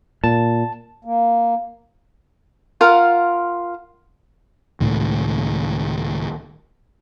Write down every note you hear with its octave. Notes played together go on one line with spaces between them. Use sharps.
A#2 A5
A#3
F4 A#4 F5 F#5
C#2 A2 D#3